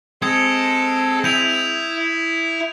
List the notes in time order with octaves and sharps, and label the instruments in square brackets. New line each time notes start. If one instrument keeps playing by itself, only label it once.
[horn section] G#3 C4 [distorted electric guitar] A4 [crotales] D#6 G#6
[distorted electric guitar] E4 [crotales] G6 D#7 F7